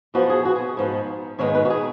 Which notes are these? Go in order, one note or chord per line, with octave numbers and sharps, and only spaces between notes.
F#2 F3 B3 F#4
G#4
F#4
G#4
G#2 F3 B3
G#2 D#3 G#3 B3 C#5
B4
F#4
G#4